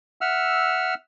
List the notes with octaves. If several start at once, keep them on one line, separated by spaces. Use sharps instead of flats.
E5 F#5 E6 F6